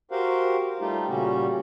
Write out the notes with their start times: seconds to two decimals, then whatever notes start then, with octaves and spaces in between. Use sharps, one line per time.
0.11 F#4 G4 A#4 C5 F5 F#5
0.80 G3 A3 D#4 F4 G4
1.08 A#2 C#3 G3 C#4 F#4 G4